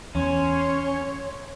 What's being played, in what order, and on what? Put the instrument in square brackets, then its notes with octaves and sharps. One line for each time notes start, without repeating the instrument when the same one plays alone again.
[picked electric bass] E2 [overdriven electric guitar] C#4 [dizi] C#5 [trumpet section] C6